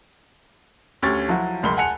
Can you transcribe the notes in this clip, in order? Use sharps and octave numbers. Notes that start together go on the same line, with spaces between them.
D2 C#4 G4 C#6 G#6 A6
F3 F#3 E4 F#4
F#1 C#2 A#4 B5 C6 G7
F#5 G#5 A5 F#6 C#7 F7